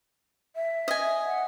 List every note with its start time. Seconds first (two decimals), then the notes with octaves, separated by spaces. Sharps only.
0.56 E5
0.88 D#5 G#5
1.27 F#5